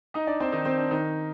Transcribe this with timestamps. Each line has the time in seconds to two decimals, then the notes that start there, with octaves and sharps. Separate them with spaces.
0.14 D#4 D#5
0.27 D4 D5
0.40 C4 C5
0.52 D#3 D#4
0.65 C4
0.78 D4
0.91 D#3 D#4